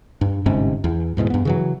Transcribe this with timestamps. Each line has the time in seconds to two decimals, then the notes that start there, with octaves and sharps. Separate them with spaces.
0.21 G2
0.46 G1 G#2 C3 C#4
0.84 E2
1.17 E2 G#2 B2 E3
1.30 G2 B3
1.45 C#3 E3 F#3